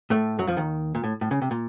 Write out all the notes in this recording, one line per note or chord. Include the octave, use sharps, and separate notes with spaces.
A2 A3
F#2 F#3
F2 F3
D#2 D#3
A#2
A2
A2
C#3
C3
A#2